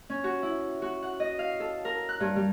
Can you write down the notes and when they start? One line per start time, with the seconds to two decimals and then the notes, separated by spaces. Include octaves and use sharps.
0.10 C#4
0.24 F#4
0.43 E4
0.82 F#4
1.02 F#5
1.20 D#5
1.39 F5
1.60 A4
1.85 A#4
2.09 F#6
2.20 G2
2.36 G3